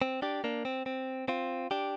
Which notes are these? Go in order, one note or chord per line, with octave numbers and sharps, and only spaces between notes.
C4
D4 G4
A#3 D4
C4
C4
C4 F4
D4 G4